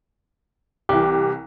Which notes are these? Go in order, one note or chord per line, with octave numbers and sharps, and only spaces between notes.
C2 E3 G4